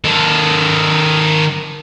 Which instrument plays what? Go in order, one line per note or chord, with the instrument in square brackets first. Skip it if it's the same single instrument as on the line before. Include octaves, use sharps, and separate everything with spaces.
[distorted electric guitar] D#3 A4